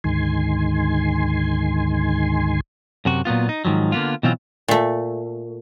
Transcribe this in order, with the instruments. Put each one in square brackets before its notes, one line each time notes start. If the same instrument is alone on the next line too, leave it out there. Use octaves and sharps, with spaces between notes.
[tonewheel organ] D2 G#2 D#3 G#5 C6
[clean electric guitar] F#2 C3 F#4
A#2 F#3 B3 F4
D#4
G#2 D#3 F3 F#3
D3 A#3 B3 F4
B2 E3 F#3 C4 F4
[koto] A#2 A3